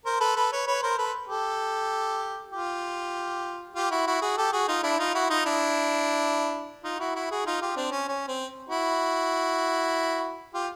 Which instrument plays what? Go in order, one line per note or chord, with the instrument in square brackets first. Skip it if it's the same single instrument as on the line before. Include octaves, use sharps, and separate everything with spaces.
[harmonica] A#4 C5
A4 B4
A4 B4
B4 C#5
B4 C#5
A#4 C5
A4 B4
G4 A4
F4 G4
F4 G4
E4 F#4
E4 F#4
F#4 G#4
G4 A4
F#4 G#4
D#4 F4
D4 E4
D#4 F4
E4 F#4
D#4 F4
D4 E4
D#4 F4
E4 F#4
E4 F#4
F#4 G#4
D#4 F4
F4 G4
C4 D4
C#4
C#4
C4
E4 F#4
F4 G4